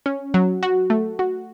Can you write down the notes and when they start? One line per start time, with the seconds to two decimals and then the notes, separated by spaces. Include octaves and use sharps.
0.06 C#4
0.34 F#3
0.63 F#4
0.90 A3
1.19 F#4